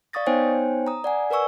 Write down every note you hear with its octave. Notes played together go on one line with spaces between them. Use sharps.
D5 F5 C#6 D#6 A6 A#6
B3 D#4 C5 C#5 G5 G#5
A#5 D#6
D5 F#5 G#5
A#4 B4 D5 G#5 C#6 E6